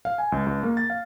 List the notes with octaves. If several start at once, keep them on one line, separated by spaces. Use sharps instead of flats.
F5
G#5
C#2
C#2
A#3
A6
F5